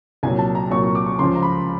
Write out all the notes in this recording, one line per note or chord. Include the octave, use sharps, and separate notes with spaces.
C2 A#2 F#3 G#5
A5
A#5
C2 A#2 F#3 C#6
C#6
D6
C#6
C#2 C#3 F3 C6
A#5
B5